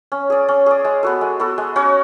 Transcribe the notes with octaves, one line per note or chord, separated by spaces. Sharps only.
C#4
G#4 D5
C#4
G#4 D5
G#3
B3 F#4 A4
G#3
B3 F#4 A4
G#3
C#4 F#4 C#5